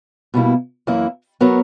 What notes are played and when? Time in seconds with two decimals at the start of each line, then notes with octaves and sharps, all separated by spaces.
0.34 B2 G3 A#3 E4
0.87 F#2 E3 A#3 E4
1.40 F#3 B3 F#4 A#4 C#5